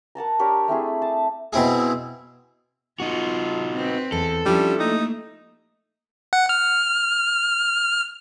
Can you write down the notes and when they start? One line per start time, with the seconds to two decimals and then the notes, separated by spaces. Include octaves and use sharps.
0.15 A#4 F#5 A5 A#5
0.39 D4 G4 A#4 C#5
0.68 A3 C4 E4 G#4
1.02 A5
1.53 B2 C4 E4 G#4
3.00 D#4 F4 F#4
3.75 C4 B4
4.12 E2 E4 A4
4.46 F3 G3 C#4 D4 E4
4.80 A3 A#3 D#4
6.33 F#5
6.49 F6